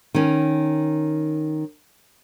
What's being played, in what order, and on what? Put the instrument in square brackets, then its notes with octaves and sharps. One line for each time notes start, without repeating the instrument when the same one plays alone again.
[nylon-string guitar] D#3 C#4